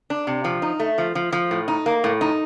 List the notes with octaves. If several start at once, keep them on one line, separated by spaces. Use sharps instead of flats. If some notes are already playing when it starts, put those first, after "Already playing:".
D4
C3
F3
D#4
A3
F3
F3
F3
A2
D#4
A#3
A2
D#4